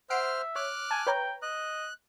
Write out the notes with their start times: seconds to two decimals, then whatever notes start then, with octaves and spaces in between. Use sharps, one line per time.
0.10 C5 E5 F#5 F6 C7 D7
0.56 C#5 D6 F6 F#6
0.91 G#5 A5
1.07 B4 C#5 G5 A#5
1.42 D#5 F#6